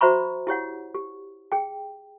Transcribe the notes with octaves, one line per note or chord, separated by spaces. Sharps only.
F#4 C5 E5 A#5 B5 C#6
E4 G4 C#5 F#5
G4
G#4 G5